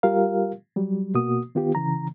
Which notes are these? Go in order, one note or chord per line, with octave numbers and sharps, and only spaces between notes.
G3 F4 G4 A#4 F5
F#3 G3
B2 A#3 F#4 D#6
D#3 B3 F4 G4
C#3 E3 A#5